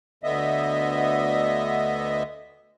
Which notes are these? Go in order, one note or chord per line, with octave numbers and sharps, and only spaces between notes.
D2 D3 B3 D#5 E5